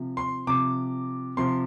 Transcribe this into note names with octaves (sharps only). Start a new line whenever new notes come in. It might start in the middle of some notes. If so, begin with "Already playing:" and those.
Already playing: C3 F3
C6
C3 F3 D6
C3 F3 C6